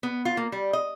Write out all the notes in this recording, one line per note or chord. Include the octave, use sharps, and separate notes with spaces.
B3
F4
A#3
G3
D#5